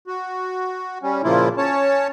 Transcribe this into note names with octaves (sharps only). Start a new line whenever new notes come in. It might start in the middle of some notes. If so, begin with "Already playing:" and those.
F#4
G3 C#4
A#2 C#3 F3 A#3 E4 F4
C#4 C#5 A5